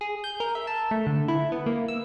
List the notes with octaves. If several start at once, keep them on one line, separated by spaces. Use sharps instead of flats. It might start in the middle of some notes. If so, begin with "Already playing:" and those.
G#4
G6
A#4
E5
A5
A3
D3
E4
B3
A#3
E6